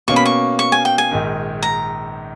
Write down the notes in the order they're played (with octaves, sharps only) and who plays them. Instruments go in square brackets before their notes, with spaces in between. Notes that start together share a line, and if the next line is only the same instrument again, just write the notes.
[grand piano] B2 A#3 C#4 [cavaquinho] C#6
[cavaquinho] B5
C#6
C#6
G#5
G5
G#5
[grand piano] A#1 G#2 D#3
[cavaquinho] A#5